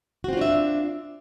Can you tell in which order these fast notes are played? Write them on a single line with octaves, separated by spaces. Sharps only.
F#4 C4 F4 D4 E5